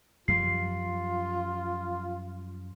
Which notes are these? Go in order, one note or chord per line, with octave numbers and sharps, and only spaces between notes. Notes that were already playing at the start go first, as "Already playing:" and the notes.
F#2 F3 G3 F4 C7